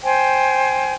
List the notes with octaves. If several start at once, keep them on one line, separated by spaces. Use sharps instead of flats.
C5 G5 G#5